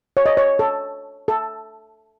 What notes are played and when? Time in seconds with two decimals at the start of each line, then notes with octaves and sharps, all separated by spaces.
0.17 C#5
0.26 D#5
0.37 C#5
0.59 A4
1.28 A4